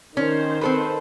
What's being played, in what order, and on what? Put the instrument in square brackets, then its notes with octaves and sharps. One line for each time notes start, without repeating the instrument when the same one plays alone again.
[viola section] D#3 C5 [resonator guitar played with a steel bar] C#4
[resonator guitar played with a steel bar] C4 A4 B4